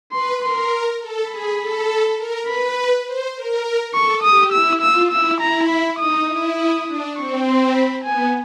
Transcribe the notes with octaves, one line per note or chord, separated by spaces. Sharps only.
B4 C6
A#4 C6
A4
G#4 B5
A4
A#4
B4 B5
C5
A#4
A4 C#6
G4 D#6
E4 E6
F4 E6
E4 E6
E4 A#5
B5
D#4 D#6
E4
D#6
D4
C4 C#6
C6
B5
B3 G#5